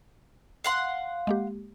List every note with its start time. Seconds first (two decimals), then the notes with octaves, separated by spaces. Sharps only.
0.64 F5 F#5 C6
1.27 G#3 A#3 G4